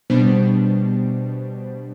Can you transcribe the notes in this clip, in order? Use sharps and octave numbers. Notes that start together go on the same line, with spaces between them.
B2 G3 B3 D4 C5